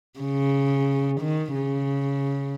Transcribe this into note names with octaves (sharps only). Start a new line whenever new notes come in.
C#3
D#3
C#3